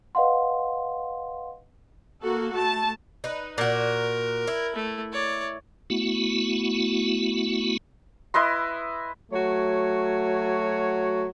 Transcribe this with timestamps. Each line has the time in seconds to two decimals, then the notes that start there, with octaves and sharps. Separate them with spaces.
0.15 B4 D#5 F5 F#5 C6
2.22 A#3 F#4 A4
2.52 A3 A5
3.24 D#4 B4
3.58 A#2 F#4 A#4
4.47 E4
4.76 A3
5.12 C#5 D5
5.90 A3 B3 E4 F#4
8.34 E4 B4 D#5 C6
9.32 F#3 A3 F#4 C#5